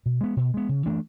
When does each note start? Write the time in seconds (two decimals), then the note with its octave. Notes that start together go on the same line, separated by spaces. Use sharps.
0.06 B2
0.21 G#3 B3
0.37 B2
0.54 G#3 B3
0.69 C#3
0.86 E3 A3 D4